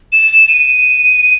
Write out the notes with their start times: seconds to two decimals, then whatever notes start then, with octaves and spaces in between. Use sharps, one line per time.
0.12 E7
0.49 D#7